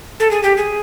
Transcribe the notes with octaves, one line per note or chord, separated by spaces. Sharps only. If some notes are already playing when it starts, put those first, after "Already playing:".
A4
G#4
G4
G#4